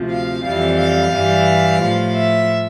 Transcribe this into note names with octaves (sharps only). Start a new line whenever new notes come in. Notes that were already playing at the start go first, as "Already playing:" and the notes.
Already playing: D2 C3 F3
F5
F2 E3 G3 F5
F5
G2 E3 G3
A2 F3
E5